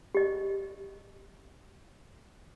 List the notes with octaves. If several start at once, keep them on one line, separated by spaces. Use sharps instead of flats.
G4 D#5